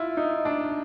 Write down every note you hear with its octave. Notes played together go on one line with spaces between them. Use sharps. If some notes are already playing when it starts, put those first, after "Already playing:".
Already playing: E4 F4
D#4
D4